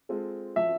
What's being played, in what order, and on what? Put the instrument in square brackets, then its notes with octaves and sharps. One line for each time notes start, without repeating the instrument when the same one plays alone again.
[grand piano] G#3 C4 F4 A4
[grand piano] F3 [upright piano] E5